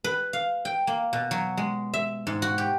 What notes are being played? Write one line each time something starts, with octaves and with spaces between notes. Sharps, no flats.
B4
F5
G5
A#3
B2
F#3
G#3
E5
G#2
F#4
G4